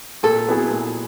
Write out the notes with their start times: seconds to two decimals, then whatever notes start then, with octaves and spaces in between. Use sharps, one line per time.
0.23 A#2 A4
0.47 F#3 B3 E4 G#4
0.71 A#2